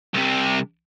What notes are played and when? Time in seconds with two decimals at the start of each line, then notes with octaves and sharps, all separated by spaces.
0.14 C2 C3